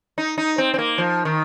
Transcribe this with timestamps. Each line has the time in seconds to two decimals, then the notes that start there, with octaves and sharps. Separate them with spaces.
0.18 D#4
0.38 D#4
0.58 C4
0.74 C4
0.78 A#3
0.98 F3
1.25 D#3